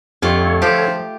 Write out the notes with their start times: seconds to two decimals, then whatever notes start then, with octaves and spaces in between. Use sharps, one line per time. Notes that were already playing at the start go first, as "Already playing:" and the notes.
0.22 F2 D3 A3 F4 G4 A4 C#5
0.62 F3 G4 A5